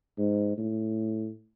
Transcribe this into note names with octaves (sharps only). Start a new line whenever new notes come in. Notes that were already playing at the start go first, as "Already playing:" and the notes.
G#2
A2